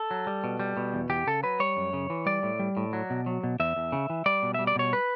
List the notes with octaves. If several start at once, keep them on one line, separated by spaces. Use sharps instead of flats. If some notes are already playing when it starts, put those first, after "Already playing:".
Already playing: A4
F#3
G3
B2
G3
B2
E2
E2 G4
C#3 A4
F#3 B4
G3 C#5
F#2
C#3
E3
G3 D5
A2
G3
A2
F#3
B2
F#3
B2
E2 E5
E2
C#3
E3
G3 D5
B2
G3 E5
D5
B2 C#5
B4